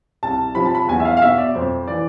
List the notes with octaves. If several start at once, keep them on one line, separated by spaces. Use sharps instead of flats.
C2 A5
C3 F3 B5
A5
B5
E2 G#5
E5
F5
F5
B2 E5
D5
F2 C5
E3 D5